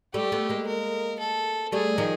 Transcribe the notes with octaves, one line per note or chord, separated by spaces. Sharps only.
G3 A3 G4
A3 B3
G#3 A#3
A#4
A4
G3 A3 G#4
D#3 F3